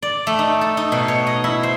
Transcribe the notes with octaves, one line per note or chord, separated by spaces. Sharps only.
D5
A3
D#4
A4
D#4
B2
C#5
D#5
E4
C5